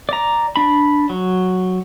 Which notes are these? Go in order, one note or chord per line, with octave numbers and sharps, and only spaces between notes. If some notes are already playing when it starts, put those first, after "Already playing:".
D5 A#5
D4 B5
F#3